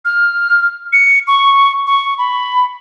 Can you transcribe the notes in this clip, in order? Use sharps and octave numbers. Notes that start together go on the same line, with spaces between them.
F6
C#7
C#6
C#6
B5